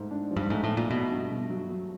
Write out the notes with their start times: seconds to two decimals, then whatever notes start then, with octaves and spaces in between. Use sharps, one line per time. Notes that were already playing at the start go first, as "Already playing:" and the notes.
Already playing: G#2 A3
0.11 D4
0.31 F3
0.37 G2
0.50 G#2 A3
0.64 A2
0.71 A3
0.77 A#2
0.90 B2 A3
1.11 G2
1.31 G2
1.50 F#3
1.70 F#3